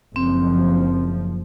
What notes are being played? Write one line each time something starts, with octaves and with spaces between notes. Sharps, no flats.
F#1 F3 C4